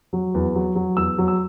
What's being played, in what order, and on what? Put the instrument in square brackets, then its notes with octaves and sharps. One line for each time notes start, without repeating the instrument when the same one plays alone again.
[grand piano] F#3
E2
F#3
F#3
E2 E6
F#3
E6